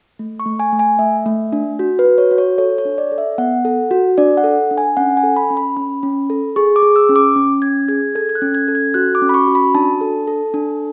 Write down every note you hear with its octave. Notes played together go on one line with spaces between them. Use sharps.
A3
C#6
A3
G#5
A3
G#5
A3 E5
A3
D4
F#4
B4
F#4
C#5
F#4
C#5
A4 C#5
C#5
D4
D5
A4
E5
B3 F#5
A4
F#4
D4 D5
F#5
A4
D4
G#5
C#4 F#5
G#5
A4
B5
C#4
B5
C#4 B5
C#4
A4
G#4 C#6
D6
G#4
E6
C#4
D6
C#4
C#4 G#6
G#4 G#6
A4 G#6
G#6
F#6
C#4
G#6
A4
G#6
F#4 F#6
D6
C#4
B5
C#6
F#4
B5
D4 A5
A4
A4
D4